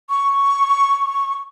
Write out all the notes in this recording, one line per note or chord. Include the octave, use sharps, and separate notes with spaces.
C#6